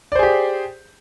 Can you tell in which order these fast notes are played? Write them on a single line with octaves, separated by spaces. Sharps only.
D5 C5 G#4 G4